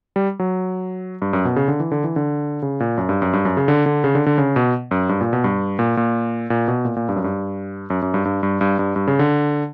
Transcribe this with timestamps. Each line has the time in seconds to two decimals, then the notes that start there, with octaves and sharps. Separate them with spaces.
0.16 G3
0.39 F#3
1.22 G2
1.33 F#2
1.45 B2
1.56 C#3
1.68 D3
1.80 E3
1.91 D3
2.04 E3
2.16 D3
2.62 C#3
2.80 A#2
2.98 F#2
3.09 G2
3.22 F#2
3.33 G2
3.45 F#2
3.57 C#3
3.68 D3
3.86 D3
4.04 C#3
4.15 D3
4.26 D3
4.38 C#3
4.56 B2
4.91 F#2
5.09 G2
5.21 A#2
5.33 B2
5.44 G2
5.79 A#2
5.97 A#2
6.50 A#2
6.68 B2
6.85 A#2
6.96 A#2
7.09 G2
7.16 F#2
7.24 G2
7.90 F#2
8.02 F#2
8.14 G2
8.25 G2
8.43 G2
8.61 G2
8.79 G2
8.96 G2
9.07 C#3
9.19 D3